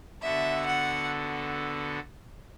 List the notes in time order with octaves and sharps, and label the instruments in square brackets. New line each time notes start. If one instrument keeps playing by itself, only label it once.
[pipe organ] D3 B3 F#4 A4 [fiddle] E5
[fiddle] F#5